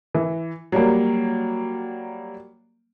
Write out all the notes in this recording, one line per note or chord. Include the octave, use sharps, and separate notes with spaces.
E3
F#3 G3 A#3